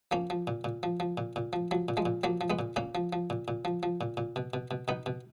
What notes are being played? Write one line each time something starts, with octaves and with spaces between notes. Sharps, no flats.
F3 A#3 C#4
F3
A#2
A#2
F3
F3
A#2
A#2
F3
F3 F#3
A#2
F3 G#3
A#2
F3 F#3 A#3
F3
G#3 B3
A#2
A#2 A#3 C#4
F3
F3
A#2
A#2
F3
F3
A#2
A#2
B2
B2
B2
B2 B3 D#4
B2